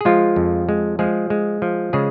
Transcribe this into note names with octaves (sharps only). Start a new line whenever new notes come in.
G#4
F3 G#3 F4
F2
G#3
F3 G#3 G#4
G#3
F3
C#3 G#3 G#4